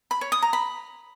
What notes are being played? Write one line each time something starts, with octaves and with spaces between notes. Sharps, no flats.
B5
C#5
D#6
A#5
B5